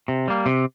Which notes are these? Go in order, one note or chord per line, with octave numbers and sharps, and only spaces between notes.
C3
G3 A#3
C3